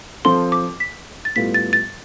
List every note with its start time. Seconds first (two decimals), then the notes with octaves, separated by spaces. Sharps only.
0.25 F3 C4 F4 A4 C6
0.52 D6
0.80 B6
1.25 A6
1.36 A2 G3 B3 F4 A4 B6
1.54 A6
1.73 A6